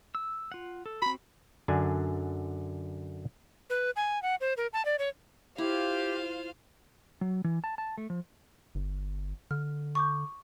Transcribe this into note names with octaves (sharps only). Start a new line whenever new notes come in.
E6
F4 F#5
A4
C4 F#4 B5
F#2 D3 D4 G#5
B4
G#5
F#5
C5
A#4
A5
D5
C#5
E4 F4 G4 C5 F5
F#3
E3
A5
A5
A3
F3
G1
D3 F6
C#6 D6 G6